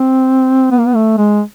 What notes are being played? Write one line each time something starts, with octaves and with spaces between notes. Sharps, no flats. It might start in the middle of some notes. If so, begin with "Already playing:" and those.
Already playing: C4
B3
A#3
B3
A3
G#3